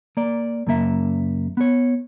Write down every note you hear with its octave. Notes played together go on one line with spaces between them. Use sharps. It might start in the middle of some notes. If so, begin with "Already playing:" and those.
A#3 D5
F#2 C#3 A#3 E5
B3 C#5